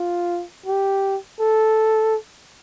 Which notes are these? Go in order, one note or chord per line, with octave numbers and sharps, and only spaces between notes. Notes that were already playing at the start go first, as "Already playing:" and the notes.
Already playing: F4
G4
A4